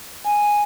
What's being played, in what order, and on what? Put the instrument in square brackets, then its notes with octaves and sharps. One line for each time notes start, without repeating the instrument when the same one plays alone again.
[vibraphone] G#5